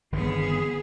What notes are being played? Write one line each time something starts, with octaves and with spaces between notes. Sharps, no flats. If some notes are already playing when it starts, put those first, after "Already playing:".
G1 D#3 E3 B3 G#4